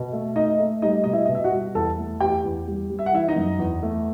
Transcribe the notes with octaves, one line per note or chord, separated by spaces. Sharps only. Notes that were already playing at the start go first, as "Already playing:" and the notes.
Already playing: B2
A3
A3 D#4 D#5
A3
G3 D#4 D#5
B2 D#5
E4 E5
B2 D#5
E5
F#4 F#5
G3
E2 A4 A5
A3
E2 G4 G5
E2
G3
G3
E5
F#5
E3 E4 E5
D#4 D#5
F#2
E2
A3